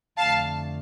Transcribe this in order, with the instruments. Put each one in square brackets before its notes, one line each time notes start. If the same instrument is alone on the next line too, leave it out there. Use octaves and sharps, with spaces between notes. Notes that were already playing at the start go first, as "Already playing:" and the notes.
[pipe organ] F2 D3 A3 D4 [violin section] F5 A5